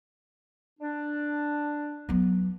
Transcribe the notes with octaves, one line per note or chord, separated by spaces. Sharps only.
D4
F#3 B3